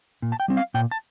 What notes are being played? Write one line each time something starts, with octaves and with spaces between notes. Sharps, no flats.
A#2
A5
G5
G3 C4
F5
A#2 G5
A5